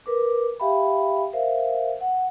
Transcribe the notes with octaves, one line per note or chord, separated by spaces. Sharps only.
A#4 B4 D6
G4 E5 F5 G5 B5
A#4 C5 E5 F5
F#5